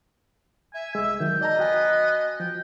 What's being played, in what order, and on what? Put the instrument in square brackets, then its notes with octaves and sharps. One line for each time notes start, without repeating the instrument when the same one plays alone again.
[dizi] E5 [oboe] G#5
[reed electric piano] C2 G#3 [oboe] E6
[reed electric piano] D#3 F#3 [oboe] G5
[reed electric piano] D5 A5 A#5 [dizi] D#5
[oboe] B3 [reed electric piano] F#4 G5 G#5
[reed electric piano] F3 [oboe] G5